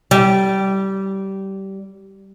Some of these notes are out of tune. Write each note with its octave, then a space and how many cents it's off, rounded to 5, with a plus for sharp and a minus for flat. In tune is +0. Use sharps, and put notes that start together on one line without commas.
G3 -20